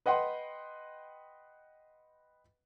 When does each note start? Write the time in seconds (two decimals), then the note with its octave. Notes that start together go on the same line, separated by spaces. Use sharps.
0.06 B4 D#5 F#5 G5 C6